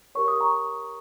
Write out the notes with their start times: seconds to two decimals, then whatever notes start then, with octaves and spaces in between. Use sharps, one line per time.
0.15 G4 A#4 C#5 C#6
0.28 D#6
0.41 A#5 C#6